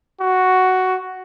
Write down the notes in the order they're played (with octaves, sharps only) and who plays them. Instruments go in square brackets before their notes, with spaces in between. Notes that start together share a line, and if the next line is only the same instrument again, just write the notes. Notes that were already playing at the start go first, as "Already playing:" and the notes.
[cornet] F#4